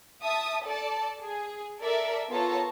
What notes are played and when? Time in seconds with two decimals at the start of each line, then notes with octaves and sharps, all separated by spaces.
0.23 E5 A5 D#6
0.65 A4 D5 A5
1.22 G#4
1.80 A4 A#4 D5 E5
2.30 B3 F4 A4 C#5 A5 A#5